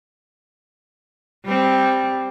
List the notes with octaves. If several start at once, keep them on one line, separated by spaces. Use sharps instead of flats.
G3 C4